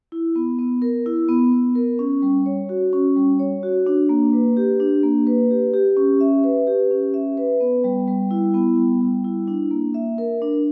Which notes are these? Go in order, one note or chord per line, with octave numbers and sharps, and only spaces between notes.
E4
B3
B3
A#4
E4
B3
B3
A#4
C#4
G3
C#5
F#4
C#4
G3
C#5
F#4
D4
A#3
B4
G4
D4
A#3
B4
G4
G4
C#4
E5
B4
G4
C#4
E5
B4
B3
G3
G3
E4
B3
G3
G3
E4
D4
A#3
E5
A#4
D4